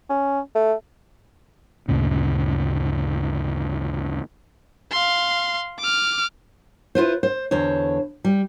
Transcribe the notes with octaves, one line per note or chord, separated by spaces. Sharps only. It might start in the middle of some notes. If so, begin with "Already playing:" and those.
C#4
A3
D2 G2 A#2 C#3
F5 C6
D6 F6
E4 F4 B4 C5
C5
E2 D3 C5 C#5
G3